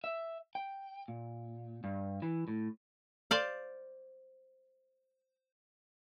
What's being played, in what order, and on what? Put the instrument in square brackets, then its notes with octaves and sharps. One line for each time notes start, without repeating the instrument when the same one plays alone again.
[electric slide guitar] E5
G5
A#2
G2
E3
A2
[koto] C5 D5 F5